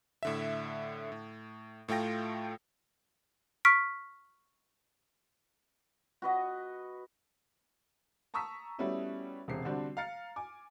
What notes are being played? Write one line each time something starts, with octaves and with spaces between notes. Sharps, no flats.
A2 D3 E5
A2
A2 A3 F4 G5 A#6
C#6 F6 B6 D7
F#4 B4 D#5
A5 A#5 C#6 D#6 E6 B6
G3 A3 B3 C#4 E4 F#4
E1 C3 C7
D3 G3 C4 D4 F#4
F5 A#5 F6 A6 C#7
G#5 D6